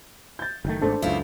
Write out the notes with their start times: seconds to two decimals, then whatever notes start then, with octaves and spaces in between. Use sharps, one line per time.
0.39 G6 A6
0.65 F#1 D#3 A3
0.81 G#1 G#2 A3 D4 A4 C5
1.02 C#2 F#2 E4 F4